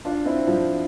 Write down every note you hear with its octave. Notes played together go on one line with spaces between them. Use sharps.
D4 F4
C4 E4
F3